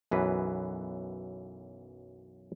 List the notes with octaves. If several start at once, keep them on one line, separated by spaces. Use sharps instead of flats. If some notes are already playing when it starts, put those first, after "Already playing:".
B1 F#2 E3 B4